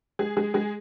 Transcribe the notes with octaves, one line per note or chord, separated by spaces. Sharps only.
G#3 G#4
G#3 G#4
G#3 G#4